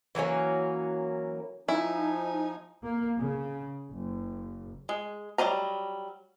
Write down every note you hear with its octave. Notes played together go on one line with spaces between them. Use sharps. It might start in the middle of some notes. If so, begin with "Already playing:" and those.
E3 F#3 A#3 C#4
F3 D#4 E4 G#5
A#3
C#3
F#1
G#3
F#3 G3 A#3 D#5 A#5